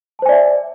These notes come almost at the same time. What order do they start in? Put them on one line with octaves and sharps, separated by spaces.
A5 C5 G#5 D5 E5